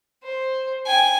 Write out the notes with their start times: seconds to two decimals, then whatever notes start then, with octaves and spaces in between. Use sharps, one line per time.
0.24 C5
0.87 G5 G#5